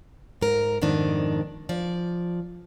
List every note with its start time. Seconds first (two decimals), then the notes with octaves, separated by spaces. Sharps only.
0.41 G#2 A#4
0.82 F2 G#2 B2 D#3 D4
1.69 F3 D5